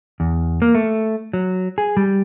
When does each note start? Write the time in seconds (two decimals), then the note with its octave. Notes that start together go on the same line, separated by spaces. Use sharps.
0.20 E2
0.62 A#3
0.75 A3
1.33 F#3
1.78 G#4
1.97 G3